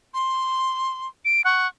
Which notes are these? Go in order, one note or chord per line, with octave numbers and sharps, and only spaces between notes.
C6
D7
F#5 C#6